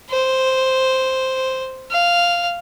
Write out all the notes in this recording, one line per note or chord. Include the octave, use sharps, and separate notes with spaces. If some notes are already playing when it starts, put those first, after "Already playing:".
C5
F5